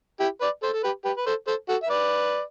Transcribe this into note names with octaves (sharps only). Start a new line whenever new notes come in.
E4 G4
B4 D5
A4 C5
A4
G4 B4
G4 B4
B4
A4 C5
A4 C5
F#4 A4
E5
B4 D5